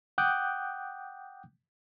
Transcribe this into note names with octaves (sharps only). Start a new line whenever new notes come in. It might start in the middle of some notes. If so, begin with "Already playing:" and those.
F#5 G5 D6 D#6 F#6 G6